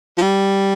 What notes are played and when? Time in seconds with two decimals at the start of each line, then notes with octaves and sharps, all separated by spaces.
0.18 F3
0.22 G3